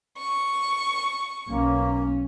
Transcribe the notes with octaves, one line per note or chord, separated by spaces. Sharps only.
C#6
B1 A#3 C#4